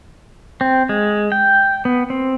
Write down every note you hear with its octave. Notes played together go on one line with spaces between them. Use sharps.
C4
G#3
G5
B3
C4